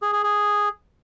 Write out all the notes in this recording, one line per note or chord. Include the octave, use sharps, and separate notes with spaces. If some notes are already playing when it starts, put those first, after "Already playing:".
G#4
G#4
G#4